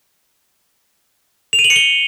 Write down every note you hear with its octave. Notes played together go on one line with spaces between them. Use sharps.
F7
D#7
F#7
C#7
G7